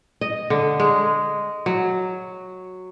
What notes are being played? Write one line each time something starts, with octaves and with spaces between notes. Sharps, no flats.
D#5
D3
G#3
F#3